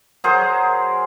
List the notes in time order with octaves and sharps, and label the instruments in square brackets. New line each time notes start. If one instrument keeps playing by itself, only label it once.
[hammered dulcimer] F#3 G#4 A#4 C5